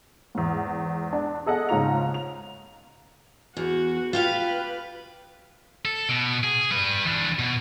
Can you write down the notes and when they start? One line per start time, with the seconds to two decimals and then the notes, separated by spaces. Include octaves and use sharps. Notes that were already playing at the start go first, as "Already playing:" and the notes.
0.35 E2 G#2
1.13 D4
1.46 G#4 A4 D#5 F#5
1.69 G#2 C#3 D#4 F4 A#5 F7
2.14 F7
3.57 E2 F#4
4.13 F4 G4 B4 F5
5.85 A4
6.09 B2
6.43 G#4
6.71 G3 B4
7.06 E3 D4
7.39 B2